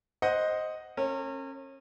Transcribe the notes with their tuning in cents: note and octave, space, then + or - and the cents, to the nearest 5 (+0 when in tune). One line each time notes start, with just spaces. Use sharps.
C5 +0 D#5 +0 F#5 +0
C#4 -35 A#4 -40